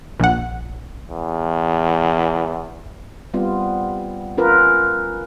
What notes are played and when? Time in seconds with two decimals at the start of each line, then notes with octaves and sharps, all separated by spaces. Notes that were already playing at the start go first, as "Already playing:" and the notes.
0.20 A#1 F#5
1.11 E2
3.34 G3 B3 C4 F4
4.37 C#4 F4 A#4 B4